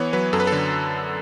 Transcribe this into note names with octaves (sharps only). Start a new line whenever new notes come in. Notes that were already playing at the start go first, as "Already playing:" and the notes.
Already playing: E3 B3 C#5
F#3 B4
F#2 A4
B4
A4
D3